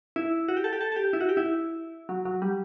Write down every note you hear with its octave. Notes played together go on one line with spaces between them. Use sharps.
E4
F#4
G4
A4
G4
A4
A4
G4
E4
F#4
G4
E4
F#3
F#3
G3